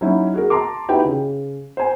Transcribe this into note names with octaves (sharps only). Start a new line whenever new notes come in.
F#3 C#4 D#4 E4
F#4 G#4 A#4
A5 A#5 C6 D6
D#4 E4 F#4 G4 B4 G5
C#3
C5 G#5